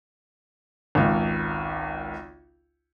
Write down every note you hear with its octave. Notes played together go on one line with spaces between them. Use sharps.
G#1 C#2